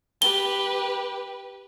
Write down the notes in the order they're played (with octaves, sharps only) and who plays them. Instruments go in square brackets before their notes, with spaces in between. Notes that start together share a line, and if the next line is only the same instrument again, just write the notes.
[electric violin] G4 B4 [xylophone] G7